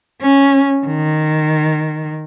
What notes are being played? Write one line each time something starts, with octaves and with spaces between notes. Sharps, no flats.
C#4
D#3